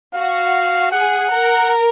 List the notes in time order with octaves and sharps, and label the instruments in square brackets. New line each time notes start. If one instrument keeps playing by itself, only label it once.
[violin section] F#4 [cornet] F5
[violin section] G#4 [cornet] F#5
[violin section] A#4